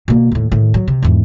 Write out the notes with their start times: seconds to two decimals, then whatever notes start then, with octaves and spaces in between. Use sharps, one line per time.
0.08 B2 A#3
0.32 D#2 A2
0.51 A2 D#3
0.74 F#3
0.88 C3
1.02 E2 G#2